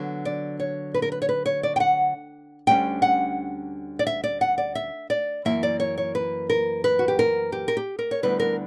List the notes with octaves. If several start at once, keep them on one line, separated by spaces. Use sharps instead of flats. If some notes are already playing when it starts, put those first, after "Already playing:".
Already playing: D3 F#3 B3
D5
C#5
B4
A#4
B4
C#5
B4
C#5
D5
G5
F#5
D2 D3 G3 C#4 G5
F#5
D5
E5
D5
F#5
D5
E5
D5
F#2 E3 A#3 E5
D5
C#5
C#5
B4
A#4
B4
F#4
G4
A#4
G4
A#4
G4
A#4
C#5
D2 D3 G3 B3 E4 B4
A#4